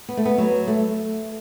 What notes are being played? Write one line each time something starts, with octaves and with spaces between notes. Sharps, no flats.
B3
A3
B3
F#3
A3